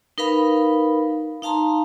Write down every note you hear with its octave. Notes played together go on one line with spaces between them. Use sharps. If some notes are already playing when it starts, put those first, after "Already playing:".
D#4 A#4 B4 F5 B5
D#4 F5 A5 A#5 C6